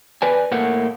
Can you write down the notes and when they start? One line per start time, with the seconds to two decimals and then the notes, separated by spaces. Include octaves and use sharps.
0.22 B4 D5 G#5
0.52 A2 A3 A#3 F#5